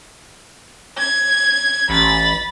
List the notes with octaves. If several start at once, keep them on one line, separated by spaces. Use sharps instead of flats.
G#6
A1 B5 A6